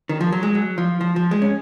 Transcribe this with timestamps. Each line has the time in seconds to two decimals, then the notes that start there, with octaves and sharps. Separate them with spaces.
0.09 D#3
0.21 F3
0.32 F#3
0.43 G#3
0.55 F#3
0.78 F3
1.01 F3
1.16 F3
1.31 G#3
1.42 C#4